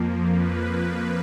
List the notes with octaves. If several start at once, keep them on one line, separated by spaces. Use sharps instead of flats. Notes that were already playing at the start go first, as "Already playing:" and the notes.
Already playing: F2 F3 A#3
B4